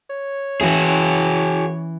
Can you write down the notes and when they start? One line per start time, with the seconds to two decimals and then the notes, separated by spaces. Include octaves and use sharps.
0.10 C#5
0.61 E3 C#4 E4 F#4 G#4